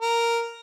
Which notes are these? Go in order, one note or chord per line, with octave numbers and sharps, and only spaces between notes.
A#4